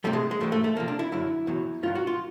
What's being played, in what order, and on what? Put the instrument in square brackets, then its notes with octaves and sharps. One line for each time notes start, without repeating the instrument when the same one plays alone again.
[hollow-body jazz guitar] E2 C3 E3 G3 A3
G#3
G#3
G#2 E3 G3 A3
A3
A3
E2 C3 F3 A#3
D4
E4
F#2 D3 F#3 E4
E2 B2 F#3
G2 D#3 F#3 F4
F#4
F4